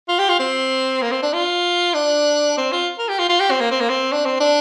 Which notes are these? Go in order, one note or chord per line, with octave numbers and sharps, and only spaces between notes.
F4
G4
F4
C4
A#3
C4
D4
F4
D4
C4
F4
A#4
G4
F4
F4
G4
C4
A#3
C4
A#3
C4
D4
C4
D4